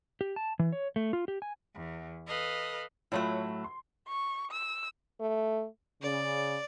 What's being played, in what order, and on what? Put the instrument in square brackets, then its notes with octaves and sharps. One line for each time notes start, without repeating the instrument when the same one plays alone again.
[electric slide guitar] G4
A5
E3
C#5
A3
F4
G4
G#5
[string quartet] E2
A4 B4 D#5 F5
[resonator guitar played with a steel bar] A2 F#3 A3 [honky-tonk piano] F4 C#5
[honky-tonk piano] C6
[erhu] C#6
E6
[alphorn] A3
[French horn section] C#3 [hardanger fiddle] D5